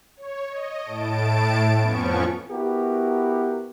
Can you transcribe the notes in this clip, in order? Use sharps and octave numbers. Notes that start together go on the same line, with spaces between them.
C#5
D#5
A2 A5 D7
F2 F3 B3 C#4 C#6
B3 E4 F#4 G4 A#4